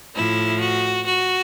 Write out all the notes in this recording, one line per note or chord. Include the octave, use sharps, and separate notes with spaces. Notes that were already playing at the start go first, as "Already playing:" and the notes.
A2 F3 E4
F#4
F#4